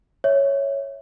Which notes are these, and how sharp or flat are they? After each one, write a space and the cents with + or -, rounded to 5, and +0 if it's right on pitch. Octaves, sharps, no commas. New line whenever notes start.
C#5 +0 E5 -10